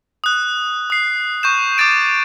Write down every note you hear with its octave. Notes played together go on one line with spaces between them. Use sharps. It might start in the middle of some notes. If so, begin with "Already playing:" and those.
D#6 F#6
D#6 C7
C#6 G6 E7
D6 G6 A6 D7